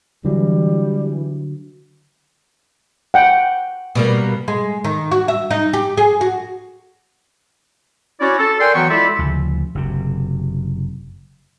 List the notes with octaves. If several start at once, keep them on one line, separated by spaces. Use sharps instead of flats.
D3 E3 F#3 G3
F#5 G5
B2 G3 A#3
G#3
D#3
F#4
E5
D#4
G4
G#4
F#4
C#4 E4 F#4 C#5 D5
A4
A#4 D5 G5 G#5 C6
E3 F#3 B3 F#4 G5 C#6
G#3 E4 F4 A4 D5 E5
D2 C#3 F3
F#1 C3